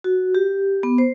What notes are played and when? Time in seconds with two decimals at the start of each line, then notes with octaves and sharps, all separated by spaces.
0.04 F#4
0.35 G4
0.83 B3
0.98 C5